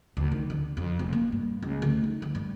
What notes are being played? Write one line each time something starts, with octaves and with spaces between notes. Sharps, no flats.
D2
D#3
D3
F2
F1
A#3
G2
C#2
D2
D#4
D2
G2